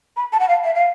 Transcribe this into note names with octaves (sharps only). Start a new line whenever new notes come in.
B5
A5
F#5
F5
E5
F5